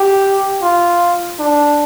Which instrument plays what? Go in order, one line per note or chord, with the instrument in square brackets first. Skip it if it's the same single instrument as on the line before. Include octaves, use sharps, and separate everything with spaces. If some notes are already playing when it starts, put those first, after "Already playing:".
Already playing: [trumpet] G4
F4
D4